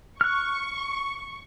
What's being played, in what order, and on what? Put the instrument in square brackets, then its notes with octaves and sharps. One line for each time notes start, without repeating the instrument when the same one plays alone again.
[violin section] C#6 [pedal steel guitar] F6 F#6